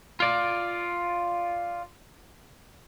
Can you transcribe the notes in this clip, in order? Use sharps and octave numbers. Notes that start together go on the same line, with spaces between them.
F4 D5